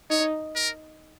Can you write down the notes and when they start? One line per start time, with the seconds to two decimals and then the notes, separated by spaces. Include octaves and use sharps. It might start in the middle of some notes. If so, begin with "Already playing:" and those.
0.10 D#4 C#5
0.55 A#4